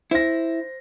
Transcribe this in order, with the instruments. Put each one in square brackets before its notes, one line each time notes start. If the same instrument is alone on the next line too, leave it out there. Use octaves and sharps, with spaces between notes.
[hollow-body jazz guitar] E4 [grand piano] C5 A#6